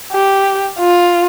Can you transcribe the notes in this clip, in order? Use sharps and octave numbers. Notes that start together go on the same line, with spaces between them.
G4
F4